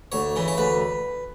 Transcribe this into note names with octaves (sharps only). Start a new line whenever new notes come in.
D2 C#5
C#3 E3
C#5
D2 B4